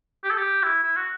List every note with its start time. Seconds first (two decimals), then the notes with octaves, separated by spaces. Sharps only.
0.24 G4
0.30 A4
0.38 G4
0.63 E4
0.83 E4
0.97 F#4